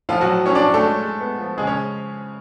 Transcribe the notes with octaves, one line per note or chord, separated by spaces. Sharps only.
A2 F3 F4
F#3 F#4
A2
A2 C#4 C#5
D4 D5
A2
A3 A4
G#3
G#3
B3
F3
C#3 G#3 G#4
C#4 C#5